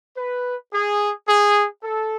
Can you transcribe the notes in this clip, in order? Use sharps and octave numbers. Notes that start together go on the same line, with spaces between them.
B4
G#4
G#4
A4